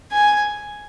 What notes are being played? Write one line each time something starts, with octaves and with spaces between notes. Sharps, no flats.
G#5